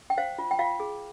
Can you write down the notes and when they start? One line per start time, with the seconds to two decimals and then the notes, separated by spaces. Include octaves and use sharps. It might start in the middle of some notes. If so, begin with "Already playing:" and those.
0.10 G5
0.18 C5 F5
0.38 F4
0.51 G5
0.59 F4 F5
0.80 G#4